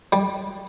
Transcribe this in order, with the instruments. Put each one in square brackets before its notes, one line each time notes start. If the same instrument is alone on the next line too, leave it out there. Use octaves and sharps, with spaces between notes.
[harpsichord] G3